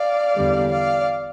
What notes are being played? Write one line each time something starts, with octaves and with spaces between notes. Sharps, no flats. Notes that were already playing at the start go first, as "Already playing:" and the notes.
Already playing: D5 F5
E2 D3 G3
D5 F5